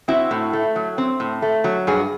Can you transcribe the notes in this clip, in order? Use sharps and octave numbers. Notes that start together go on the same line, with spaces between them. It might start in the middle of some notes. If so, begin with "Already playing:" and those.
C4 E4 F#4
A2
A3
F#3
C4
A2
A3
F#3
G2 F#4 G#4